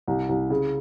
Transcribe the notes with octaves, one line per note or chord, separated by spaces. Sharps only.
C2
C2
C#3